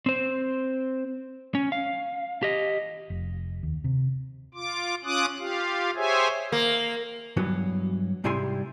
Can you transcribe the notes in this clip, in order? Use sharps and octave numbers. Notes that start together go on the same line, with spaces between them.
C4 C5
C#4
F5
G4 D#5
F1
D#2
C3
F4 D6
C#4 F4 D6 D#6 F#6
F4 G4 F5
G4 G#4 C5 C#5 E5 G#5
A#3
G2 E3 F#3 B3
G#2 C3 G3 E4 G#5 C6